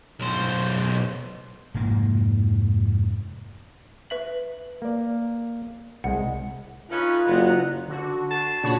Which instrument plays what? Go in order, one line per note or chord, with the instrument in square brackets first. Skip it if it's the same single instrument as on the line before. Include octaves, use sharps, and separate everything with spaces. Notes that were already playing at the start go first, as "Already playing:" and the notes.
[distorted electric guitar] B1 C5
[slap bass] F1 G#2 A#3
[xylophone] B4 E5 F#7
[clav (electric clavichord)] A#3 D5
[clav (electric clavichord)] C2 G#3 [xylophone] F#5
[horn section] A3 C#4 [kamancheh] D#4 B4 [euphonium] F4
[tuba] F#1 [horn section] C3 B3 [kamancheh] F#5 A#5
[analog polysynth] D3 F#4
[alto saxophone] A5 [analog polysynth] C7
[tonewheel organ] A#2 C#3 D4 [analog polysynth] F#4 C#5 B5